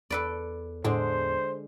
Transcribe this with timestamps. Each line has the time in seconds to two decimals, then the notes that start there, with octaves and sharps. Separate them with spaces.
0.10 E2 A4 B4 D5
0.84 A2 D3 G#3 D4 C5